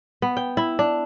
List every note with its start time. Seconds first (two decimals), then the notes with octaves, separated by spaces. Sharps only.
0.22 B3
0.37 G5
0.57 E4
0.79 D4